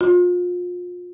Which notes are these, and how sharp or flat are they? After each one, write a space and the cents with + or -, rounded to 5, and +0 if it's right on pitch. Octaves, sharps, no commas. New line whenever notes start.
F4 +30